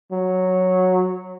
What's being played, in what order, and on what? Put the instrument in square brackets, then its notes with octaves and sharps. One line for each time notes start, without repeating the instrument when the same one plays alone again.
[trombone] F#3